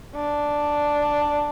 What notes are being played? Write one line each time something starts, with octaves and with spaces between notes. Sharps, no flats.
D4